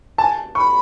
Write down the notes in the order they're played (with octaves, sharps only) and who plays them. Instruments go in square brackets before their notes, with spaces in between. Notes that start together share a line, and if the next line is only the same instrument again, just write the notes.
[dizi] G#5 [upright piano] A5
[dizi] B5 [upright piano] C#6